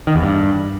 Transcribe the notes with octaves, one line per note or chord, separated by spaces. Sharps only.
D#3
E2
G2